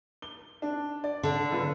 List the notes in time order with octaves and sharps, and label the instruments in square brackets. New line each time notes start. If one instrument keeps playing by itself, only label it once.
[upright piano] G7
D4
D5
[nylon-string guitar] D3
[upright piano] F#1 F4 B4